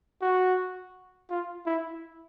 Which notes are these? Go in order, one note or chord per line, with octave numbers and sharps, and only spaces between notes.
F#4
F4
E4